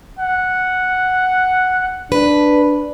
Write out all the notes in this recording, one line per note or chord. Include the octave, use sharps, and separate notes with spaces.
F#5
D4 B4